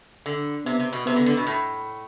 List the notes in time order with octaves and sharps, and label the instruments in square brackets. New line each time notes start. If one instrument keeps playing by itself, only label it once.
[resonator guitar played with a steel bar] D3
[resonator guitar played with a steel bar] C3 [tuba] B3
[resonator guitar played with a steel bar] C3
B2
[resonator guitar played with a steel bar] C3 [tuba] B3
[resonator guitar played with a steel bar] D3
D3
B2
A2